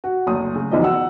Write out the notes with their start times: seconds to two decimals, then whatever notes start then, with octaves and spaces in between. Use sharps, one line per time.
0.04 F#4
0.27 F#1 D2 D#6
0.55 C#3
0.71 B1 E2 D#3 F3 D5 D#5
0.84 F#5 E6